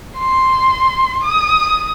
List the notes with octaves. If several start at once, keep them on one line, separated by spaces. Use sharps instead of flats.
C6
D#6